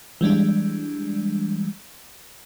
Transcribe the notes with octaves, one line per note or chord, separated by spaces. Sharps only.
E3 G3 G#3 D4